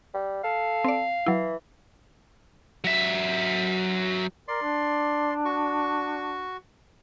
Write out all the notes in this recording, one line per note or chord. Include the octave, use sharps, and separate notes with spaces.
G3
A4 F5
C4 D5
E3 F#3 E4
F#3 E5
A#4 D5 C6
D4
F#4 C#6